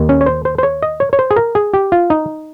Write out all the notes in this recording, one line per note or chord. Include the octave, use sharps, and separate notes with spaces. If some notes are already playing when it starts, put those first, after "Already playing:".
Already playing: D#2 D#3
C#4
C#5
C5
C5
C5
C#5
D#5
C#5
C#5
C5
G#4
A#4
G#4
G4
F4
D#4